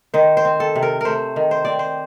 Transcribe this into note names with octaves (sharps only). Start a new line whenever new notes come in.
D#3 C5
C5
C4
A4
C3
A#4
A3 A#4 C5
D#3
C5
C4 D5
C5